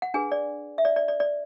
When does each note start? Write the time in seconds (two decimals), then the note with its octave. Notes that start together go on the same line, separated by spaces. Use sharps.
0.02 F#5
0.14 D4 G#4 B4 G#5
0.32 D5
0.78 E5
0.85 D5
0.96 D5
1.08 D5
1.20 D5